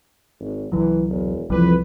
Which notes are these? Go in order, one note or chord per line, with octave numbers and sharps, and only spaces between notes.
G#1
C2 D3 E3 F#3
E1
C2 F2 D3 E3 G3 B4